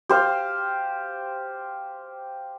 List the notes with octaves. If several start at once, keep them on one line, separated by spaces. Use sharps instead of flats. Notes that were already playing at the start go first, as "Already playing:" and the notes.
G4 C5 F5